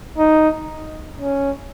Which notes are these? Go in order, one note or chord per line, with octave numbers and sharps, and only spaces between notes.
D#4
C#4